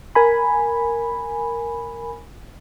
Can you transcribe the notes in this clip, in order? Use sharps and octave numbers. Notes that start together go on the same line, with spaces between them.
A#4 G#5 B5